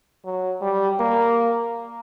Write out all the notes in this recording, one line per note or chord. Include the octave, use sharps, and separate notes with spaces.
F#3
G3
A#3